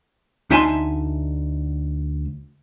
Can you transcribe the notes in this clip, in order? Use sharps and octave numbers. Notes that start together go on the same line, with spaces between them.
D2 D#4 E5 G#5 A5 C6